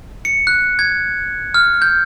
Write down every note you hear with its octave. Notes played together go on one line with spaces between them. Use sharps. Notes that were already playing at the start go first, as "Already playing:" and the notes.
C#7
F#6
G#6
F6
G6